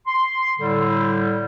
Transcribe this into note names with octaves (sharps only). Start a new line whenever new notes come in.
C6
A2 D3 G3